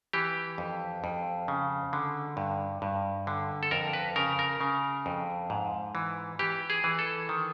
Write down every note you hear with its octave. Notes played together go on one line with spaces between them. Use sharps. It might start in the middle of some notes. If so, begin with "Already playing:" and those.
E3 G4
F2
F2
C#3
D3
G2
G2
D3
A4
F2 A#4
B4
C#3 A#4
A#4
C#3
F2
G#2
E3
E3 G4
G#4
E3
A4
D#3